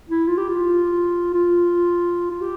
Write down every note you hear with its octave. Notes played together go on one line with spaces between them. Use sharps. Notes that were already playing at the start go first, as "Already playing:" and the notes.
E4
F4
G4
F4
F4
F4
G4